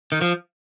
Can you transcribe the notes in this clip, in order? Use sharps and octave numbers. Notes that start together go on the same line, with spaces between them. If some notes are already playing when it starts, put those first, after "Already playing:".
D#3
F3